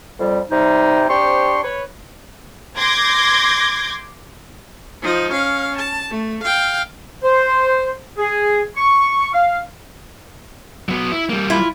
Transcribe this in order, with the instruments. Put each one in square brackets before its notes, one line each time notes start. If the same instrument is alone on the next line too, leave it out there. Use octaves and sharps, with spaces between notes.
[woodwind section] F2 G3
C3 G3 D#4
C4 D4 G4 C5 C6 C#6
B4 C#5
[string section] C6 D6 G6 G#6 A#6
[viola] F3 D#4
C#4 F5
A5
A3
F5 G5
[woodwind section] C5
G#4
C#6
F5
[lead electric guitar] F#3 B3
E4
G3 A#3
[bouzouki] E4 F4